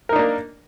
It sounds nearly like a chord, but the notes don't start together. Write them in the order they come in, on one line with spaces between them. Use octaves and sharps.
A#4 D#4 D4 A#3